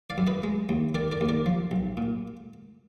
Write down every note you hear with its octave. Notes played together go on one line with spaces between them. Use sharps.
D5 F5
F#2
B4 D#5
G#3
D#2
D#3 A#4 D5
A#4 D5
D#2
A#4 D5
F3
B1
A#2